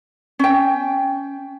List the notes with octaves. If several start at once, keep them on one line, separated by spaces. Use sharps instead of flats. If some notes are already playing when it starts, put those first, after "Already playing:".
C#4 G5